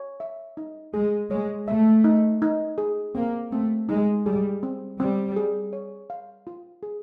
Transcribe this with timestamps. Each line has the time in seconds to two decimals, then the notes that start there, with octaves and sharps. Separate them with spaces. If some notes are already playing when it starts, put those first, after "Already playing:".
Already playing: C#5
0.20 E5
0.57 D#4
0.94 G#3 G#4
1.30 G#3 C#5
1.68 A3 E5
2.04 D#4
2.42 D#4
2.78 G#4
3.15 A#3 C4
3.52 A3 C4
3.89 G#3 D#4
4.26 G3 G#4
4.63 C4
4.99 G3 C4
5.36 G#4
5.73 C#5
6.10 F5
6.47 F4
6.83 G#4